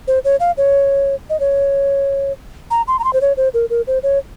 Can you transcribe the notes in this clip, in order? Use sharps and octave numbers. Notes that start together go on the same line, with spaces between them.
C5
C#5
F5
C#5
D#5
C#5
A#5
C6
A#5
C6
C5
C#5
C5
A#4
A#4
C5
C#5